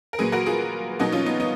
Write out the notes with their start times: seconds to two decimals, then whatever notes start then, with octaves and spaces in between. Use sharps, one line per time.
0.13 A#4
0.19 A#2 F#3 A#3 G#4 B4
0.32 F#4 A#4
0.46 F4 G#4
0.99 B2 F#3 A#3 D#4 F#4
1.12 C#4 F4
1.26 B3 D#4
1.40 B3 D#4